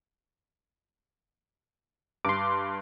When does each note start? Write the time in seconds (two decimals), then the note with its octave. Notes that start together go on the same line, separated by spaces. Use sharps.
2.25 G2 C6 D6